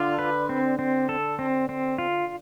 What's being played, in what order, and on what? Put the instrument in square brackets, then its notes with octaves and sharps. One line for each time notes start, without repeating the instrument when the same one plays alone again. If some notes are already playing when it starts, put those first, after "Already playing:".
Already playing: [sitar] D3 [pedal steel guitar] F4
[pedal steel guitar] B4
C4
C4
A4
C4
C4
F4